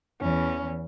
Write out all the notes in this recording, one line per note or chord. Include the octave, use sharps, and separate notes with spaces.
E2 C#4